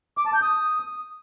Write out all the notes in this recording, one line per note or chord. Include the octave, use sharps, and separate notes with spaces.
D6
A5
G6
D#6